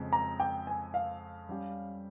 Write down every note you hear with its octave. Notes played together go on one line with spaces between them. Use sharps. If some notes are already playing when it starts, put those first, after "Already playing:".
Already playing: F2 C#3 G#3 C4
A#5
G5
G#5
F5
G3 C#4 G4